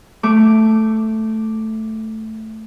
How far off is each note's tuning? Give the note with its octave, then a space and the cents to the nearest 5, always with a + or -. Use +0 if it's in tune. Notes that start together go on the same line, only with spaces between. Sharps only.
A3 +0 D6 +0